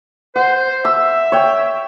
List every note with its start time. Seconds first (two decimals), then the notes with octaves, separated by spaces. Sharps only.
0.36 C5 F#5
0.85 E5 E6
1.32 C#5 G5